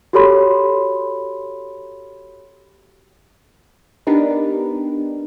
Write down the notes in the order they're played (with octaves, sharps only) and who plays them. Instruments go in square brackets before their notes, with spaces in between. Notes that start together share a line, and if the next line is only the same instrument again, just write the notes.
[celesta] F#4 G4 A4 C#5 B5 C6
[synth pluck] B3 D4 D#4 G4 A#4 B4